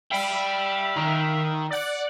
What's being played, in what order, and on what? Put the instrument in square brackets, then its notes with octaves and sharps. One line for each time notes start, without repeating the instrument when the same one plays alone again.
[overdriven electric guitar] D5 G5 [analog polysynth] E5 F5 B5
[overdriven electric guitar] D#3
[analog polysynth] D5 F#5